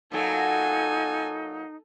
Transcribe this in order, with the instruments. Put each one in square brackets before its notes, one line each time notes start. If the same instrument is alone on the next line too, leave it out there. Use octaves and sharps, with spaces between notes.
[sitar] A#2 F#3 [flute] D#4 [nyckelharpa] A4 G#5